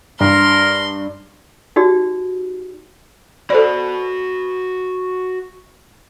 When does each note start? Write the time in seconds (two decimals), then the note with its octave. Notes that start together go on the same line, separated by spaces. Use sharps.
0.20 G2 A#4 C6
1.76 D#4 F#4 G4 D5
3.50 F#4 A4 C5 D5 B5